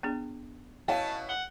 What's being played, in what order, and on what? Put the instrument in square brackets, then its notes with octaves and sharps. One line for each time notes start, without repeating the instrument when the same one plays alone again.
[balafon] B3 D4 G#4
[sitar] B2 C#4 E4 [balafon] C#5 [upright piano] F5 [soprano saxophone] A5
[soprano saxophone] F#5 [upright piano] G7